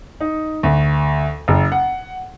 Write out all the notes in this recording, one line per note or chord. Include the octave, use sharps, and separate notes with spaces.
D#4
D2
F#1
F#5